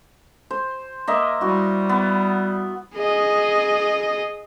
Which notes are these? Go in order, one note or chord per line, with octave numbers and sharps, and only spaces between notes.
C5
A#3 D#5 E5
G3 E4 F#4
B3
G#4 D#5